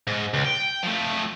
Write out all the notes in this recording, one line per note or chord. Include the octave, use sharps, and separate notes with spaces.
G#2
C#2
G5
F3 A3